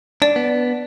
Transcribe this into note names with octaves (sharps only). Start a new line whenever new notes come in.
D4 D5
B3